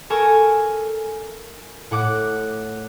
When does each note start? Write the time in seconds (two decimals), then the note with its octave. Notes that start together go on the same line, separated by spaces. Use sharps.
0.10 A4 A#4 G#5 C#6
1.91 A2 F#5 D6 F#6